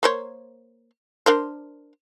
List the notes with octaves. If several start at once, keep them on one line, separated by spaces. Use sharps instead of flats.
A#3 C5 C#5
D4 A#4 C5